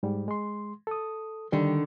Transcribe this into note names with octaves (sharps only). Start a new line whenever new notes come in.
G#2 G3
G#3 C6
A4 D#6
D3 D#3 G3